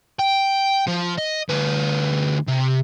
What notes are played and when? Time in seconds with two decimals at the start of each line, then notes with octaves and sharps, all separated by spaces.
0.19 G5
0.88 F3
1.18 D#5
1.49 D2 B4
2.48 C3